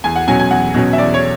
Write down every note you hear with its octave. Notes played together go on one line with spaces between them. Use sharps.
E2 G#5
F#5
B2 F#3 C#4 G#5
G#5
E2 F#5
B2 F#3 C#4
E5
E2 D5
C#5